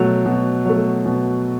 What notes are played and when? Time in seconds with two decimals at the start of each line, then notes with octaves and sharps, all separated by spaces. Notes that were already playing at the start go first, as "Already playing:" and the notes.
Already playing: B2 F#3 A3
0.26 B2
0.65 F#3 A3
1.06 B2